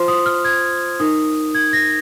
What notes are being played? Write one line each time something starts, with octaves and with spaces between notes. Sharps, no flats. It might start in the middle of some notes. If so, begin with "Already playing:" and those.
Already playing: F4 C5 C6
D#6
F6
G#6
D#4 A#4 D#6
G#6
A#6